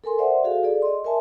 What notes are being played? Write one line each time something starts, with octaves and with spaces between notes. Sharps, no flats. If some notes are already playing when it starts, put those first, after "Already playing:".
A4 A#4 G#5 C6
C5 D5 E5 F#5
F#4 G#4 A4 F5
G#4 A4 D5
D#5 C6
A#4 D5 E5 G#5 A5